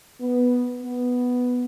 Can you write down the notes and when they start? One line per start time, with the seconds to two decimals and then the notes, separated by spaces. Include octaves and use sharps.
0.21 B3
0.83 B3